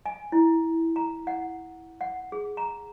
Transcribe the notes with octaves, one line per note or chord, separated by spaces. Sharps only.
G#5
E4
A#5
F#5
F#5
G#4
A#5